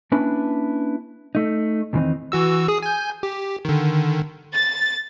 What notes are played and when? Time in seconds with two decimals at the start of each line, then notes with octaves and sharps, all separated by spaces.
0.12 A#3 C#4 D4 E4 B4
1.35 A3 D#4
1.93 E2 D#3 E3 A#3 C4 D#4
2.32 E3 F#4 E6
2.68 G#4 D#6
2.82 G#5 G6
3.23 G4
3.65 D3 D#3
4.55 A6